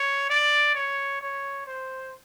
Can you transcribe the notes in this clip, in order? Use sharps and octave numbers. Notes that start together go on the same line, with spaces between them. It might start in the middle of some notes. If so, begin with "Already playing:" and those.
Already playing: C#5
D5
C#5
C#5
C5